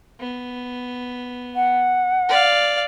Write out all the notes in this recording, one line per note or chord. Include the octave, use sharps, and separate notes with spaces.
B3
F#5
D5 F5